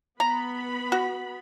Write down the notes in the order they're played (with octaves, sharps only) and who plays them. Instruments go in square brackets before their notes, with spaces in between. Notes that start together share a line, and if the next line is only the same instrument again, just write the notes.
[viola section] B3 B5 [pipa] A#5
[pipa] F#4